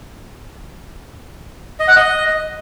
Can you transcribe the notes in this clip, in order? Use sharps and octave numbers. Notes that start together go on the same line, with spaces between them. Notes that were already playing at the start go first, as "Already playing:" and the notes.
D#5
F#5
D#5